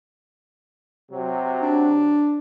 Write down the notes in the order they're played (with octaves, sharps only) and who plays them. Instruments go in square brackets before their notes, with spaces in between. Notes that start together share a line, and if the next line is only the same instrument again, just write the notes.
[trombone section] C3 F#3
[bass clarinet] D4